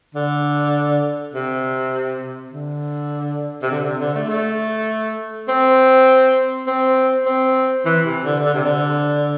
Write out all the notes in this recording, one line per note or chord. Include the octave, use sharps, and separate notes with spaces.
D3
C3
D3
C3
D3
C3
D3
A3
A3
C4
C4
C4
E3
C3
D3
D3
C3
D3